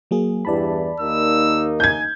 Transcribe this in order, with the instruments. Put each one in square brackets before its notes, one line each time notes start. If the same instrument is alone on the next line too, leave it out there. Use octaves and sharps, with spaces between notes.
[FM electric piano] F#3 A#3 G#4
[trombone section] E2 G2 E3 [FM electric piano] D5 A5 B5
[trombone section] D#2 A#3 D#4 [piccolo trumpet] E6
[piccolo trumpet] G#5 [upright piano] G6 G#6